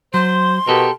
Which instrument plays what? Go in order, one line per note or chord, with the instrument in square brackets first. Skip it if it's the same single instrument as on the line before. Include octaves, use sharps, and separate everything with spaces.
[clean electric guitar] F#3 [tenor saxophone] C5 [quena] C6
[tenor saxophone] B2 [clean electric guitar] G4 A4 A#4